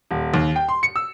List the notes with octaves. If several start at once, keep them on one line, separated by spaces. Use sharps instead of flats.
D#1
D#2
G5
C6
C#7
E6